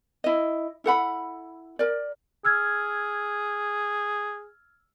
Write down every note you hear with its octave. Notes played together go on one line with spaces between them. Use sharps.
E4 D#5
E4 A4 F#5 B5
A#4 D5
G#4 E6 F6 G#6